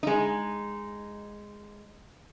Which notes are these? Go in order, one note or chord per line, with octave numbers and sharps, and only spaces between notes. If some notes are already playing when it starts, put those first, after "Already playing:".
G#3 D#4